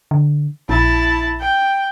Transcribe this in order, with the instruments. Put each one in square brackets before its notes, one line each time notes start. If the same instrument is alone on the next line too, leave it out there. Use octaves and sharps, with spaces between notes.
[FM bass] D3
[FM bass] A#1 [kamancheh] E4 A5
[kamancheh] G5